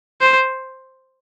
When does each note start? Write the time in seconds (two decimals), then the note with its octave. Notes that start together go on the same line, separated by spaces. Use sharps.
0.21 C5